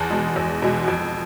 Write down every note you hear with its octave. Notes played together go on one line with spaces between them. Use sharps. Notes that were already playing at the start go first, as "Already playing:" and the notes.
Already playing: E2 A5
B2 G#3
E2
B2 G#3
F2